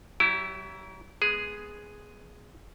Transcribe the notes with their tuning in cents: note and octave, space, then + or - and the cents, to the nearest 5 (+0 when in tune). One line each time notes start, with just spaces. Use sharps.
F#3 +35 E4 +0 G4 -10
G#3 +0 B3 -5 G#4 +0